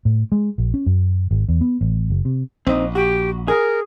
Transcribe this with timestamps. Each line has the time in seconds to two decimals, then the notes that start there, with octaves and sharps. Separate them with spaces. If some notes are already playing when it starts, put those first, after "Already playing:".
0.05 A2
0.32 G#3
0.58 A#1
0.74 C#4
0.86 F#2
1.31 G#1
1.49 E2
1.61 B3
1.81 A1
2.10 F#1
2.25 C3
2.67 A#1 C4 D#4
2.95 F#4 G4
3.48 G#4 A#4